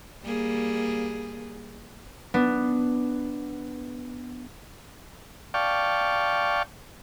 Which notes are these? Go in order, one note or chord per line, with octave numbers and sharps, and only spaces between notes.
G3 A#3 G#4
B3 D4
D5 F5 G5 A5 C#6